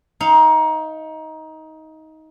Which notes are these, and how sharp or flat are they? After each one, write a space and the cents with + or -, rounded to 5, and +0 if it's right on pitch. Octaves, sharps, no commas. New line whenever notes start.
D#4 +20 F5 -10